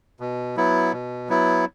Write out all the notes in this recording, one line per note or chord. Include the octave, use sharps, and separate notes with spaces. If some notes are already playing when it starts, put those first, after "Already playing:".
B2
F#3 B3 E4
B2
F#3 B3 E4